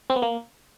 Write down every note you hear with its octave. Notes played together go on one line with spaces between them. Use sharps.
C4
B3
A#3